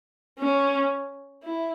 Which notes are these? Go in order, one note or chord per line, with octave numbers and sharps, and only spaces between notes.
C#4
E4